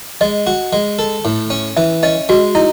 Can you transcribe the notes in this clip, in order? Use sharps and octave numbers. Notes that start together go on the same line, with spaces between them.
G#3 D#5
F#4
G#3
A4
A2
C#4
E3 E5
C#4 D#5
G#3 F#4
D#4 E4